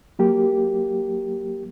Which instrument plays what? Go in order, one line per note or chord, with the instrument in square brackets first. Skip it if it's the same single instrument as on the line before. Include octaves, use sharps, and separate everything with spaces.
[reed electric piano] F#3 A#3 G4